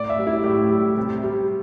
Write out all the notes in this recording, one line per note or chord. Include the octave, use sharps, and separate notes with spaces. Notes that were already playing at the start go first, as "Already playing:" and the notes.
Already playing: A2 D5
E5
G3
E4
A2 G4
G3
C3
G3